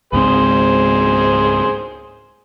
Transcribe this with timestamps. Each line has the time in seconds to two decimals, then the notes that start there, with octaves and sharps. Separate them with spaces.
0.13 C#2 G#2 C4 G#4 C5